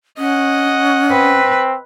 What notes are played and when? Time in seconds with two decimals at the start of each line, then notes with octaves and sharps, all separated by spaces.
0.18 C#4 D#5 F#5
1.11 C4 B4